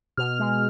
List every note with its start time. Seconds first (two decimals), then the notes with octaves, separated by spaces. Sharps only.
0.17 B2 F6
0.39 G#3